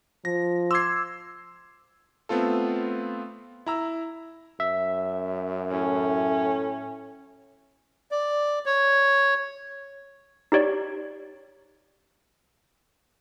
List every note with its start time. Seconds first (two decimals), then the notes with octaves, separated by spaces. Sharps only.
0.25 F3 A#6
0.71 C6 D6 E6 G#6 C7
2.29 A3 B3 C4 F4 A4
3.66 E4 A#5 E6
4.60 F#2 E5
5.72 A2 C#4
8.11 D5
8.66 C#5
10.52 D#4 G4 C#5 D5